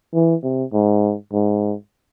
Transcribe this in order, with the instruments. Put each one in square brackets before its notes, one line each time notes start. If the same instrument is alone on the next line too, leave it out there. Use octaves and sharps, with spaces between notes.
[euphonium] E3
C3
G#2
G#2